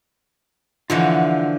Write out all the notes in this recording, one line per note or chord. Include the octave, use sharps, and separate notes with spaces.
D3 E3 F3 F4 D#5 F#5